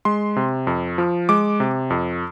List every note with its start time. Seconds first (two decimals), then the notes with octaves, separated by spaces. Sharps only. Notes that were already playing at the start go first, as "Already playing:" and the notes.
0.05 G#3 C6
0.36 C3
0.67 F2
0.98 F3
1.29 G#3 D6
1.60 C3
1.90 F2